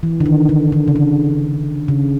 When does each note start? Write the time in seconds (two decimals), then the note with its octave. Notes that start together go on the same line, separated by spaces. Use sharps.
0.03 E3
0.20 D3
0.26 D#3
0.49 D3
0.72 D3
0.88 C#3
0.96 D3
1.88 C#3